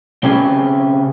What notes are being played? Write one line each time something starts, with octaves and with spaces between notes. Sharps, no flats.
C#3 C4 C#4 G4 G#4 B4